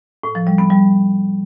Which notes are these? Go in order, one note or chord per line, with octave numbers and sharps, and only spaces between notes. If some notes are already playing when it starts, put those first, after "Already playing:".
A2
F3
G3
B3
G3